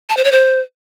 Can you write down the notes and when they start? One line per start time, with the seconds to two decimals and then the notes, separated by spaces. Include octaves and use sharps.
0.10 A5
0.17 C5
0.24 C#5
0.32 C5